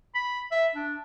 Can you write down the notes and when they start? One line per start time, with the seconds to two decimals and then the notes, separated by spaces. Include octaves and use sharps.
0.15 B5
0.51 E5
0.75 D4